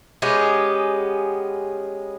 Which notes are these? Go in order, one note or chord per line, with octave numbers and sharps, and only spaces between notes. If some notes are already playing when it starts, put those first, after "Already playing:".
G#3 B3 C#4 G4